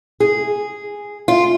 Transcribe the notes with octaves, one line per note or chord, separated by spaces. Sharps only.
G#4
F4